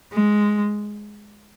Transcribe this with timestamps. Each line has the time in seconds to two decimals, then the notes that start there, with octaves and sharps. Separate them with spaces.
0.13 G#3